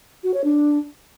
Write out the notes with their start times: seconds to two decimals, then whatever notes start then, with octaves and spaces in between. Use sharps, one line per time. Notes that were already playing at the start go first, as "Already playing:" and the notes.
0.24 F#4
0.34 C#5
0.44 D4